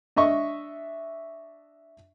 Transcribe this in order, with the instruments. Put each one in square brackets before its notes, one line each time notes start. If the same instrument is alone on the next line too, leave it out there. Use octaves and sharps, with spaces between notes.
[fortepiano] D4 D#5 E5 C#6